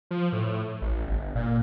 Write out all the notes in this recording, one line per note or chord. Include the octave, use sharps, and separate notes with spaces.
F3
A2
A1
G1
A#2